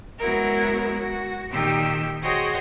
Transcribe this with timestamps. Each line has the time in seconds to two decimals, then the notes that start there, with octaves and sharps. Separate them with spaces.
0.19 F#3 G#3 B3 E4 F#4 A#4
0.98 F#4
1.50 A#2 D#3 G4 G5 E6
2.23 F#4 G#4 C5 C#5 D#5 G5